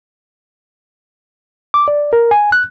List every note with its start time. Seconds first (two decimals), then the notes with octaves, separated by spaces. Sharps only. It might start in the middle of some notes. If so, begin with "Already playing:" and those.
1.74 D6
1.88 D5
2.13 A#4
2.31 G#5
2.52 F#6